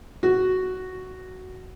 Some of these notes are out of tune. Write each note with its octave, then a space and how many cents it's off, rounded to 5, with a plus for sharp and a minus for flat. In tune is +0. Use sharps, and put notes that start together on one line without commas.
F#4 +5